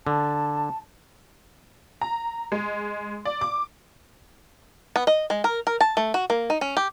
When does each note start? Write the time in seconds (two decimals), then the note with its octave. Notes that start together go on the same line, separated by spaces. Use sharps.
0.07 D3 A5
2.01 A#5
2.52 G#3
3.25 D5
3.41 D6
4.96 B3
5.07 D#5
5.30 G#3
5.44 A#4
5.67 A#4
5.81 A5
5.97 A3
6.14 F#4
6.30 A#3
6.50 D#4
6.61 C#4
6.77 G4